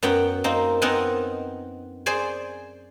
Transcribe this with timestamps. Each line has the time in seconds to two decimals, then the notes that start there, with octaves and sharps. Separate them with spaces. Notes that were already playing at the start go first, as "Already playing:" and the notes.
0.03 F#2 B3 F#5 G5
0.44 A#3 C4 D#4
0.82 B3 C4 D#4 A#4 F#5 G#5
2.06 G#4 C5 D5 G#5